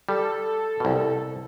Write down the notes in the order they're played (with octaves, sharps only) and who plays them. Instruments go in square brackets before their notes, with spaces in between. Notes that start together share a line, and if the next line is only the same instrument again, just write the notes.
[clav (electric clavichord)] G3 [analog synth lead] A4
[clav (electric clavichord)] C2 B2